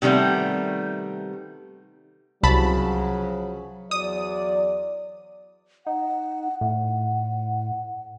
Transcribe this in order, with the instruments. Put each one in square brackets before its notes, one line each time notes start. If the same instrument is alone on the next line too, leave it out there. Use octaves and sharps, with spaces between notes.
[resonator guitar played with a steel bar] C3 D#3 G3 A3 B3
[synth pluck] C2 A5 B5 [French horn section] C#3 F3 F#3
[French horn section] E2 F#3 D5 [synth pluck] D#6
[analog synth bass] D#4 [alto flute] F#5
[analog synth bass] A2 [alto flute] F#5